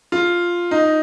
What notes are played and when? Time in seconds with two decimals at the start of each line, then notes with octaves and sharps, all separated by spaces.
0.12 F4
0.71 D#4